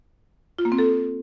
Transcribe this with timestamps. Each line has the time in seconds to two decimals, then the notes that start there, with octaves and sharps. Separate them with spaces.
0.59 F4
0.65 A#3
0.72 C4
0.78 A4